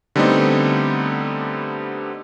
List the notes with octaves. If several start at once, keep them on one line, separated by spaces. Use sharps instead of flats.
D3 G3 A3 B3 C4 D#4